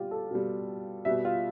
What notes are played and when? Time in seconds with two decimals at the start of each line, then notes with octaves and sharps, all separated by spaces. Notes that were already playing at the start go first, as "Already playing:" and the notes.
Already playing: B2 G3 F4 G4
0.11 A4
0.31 B2 G3
1.05 B2 G3 E5
1.25 F4